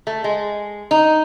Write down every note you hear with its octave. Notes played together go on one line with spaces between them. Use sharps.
A3
G#3
D#4